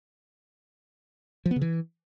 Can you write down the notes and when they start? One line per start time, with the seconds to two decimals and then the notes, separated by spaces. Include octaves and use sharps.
1.46 F3
1.51 B3
1.56 C#3
1.62 E3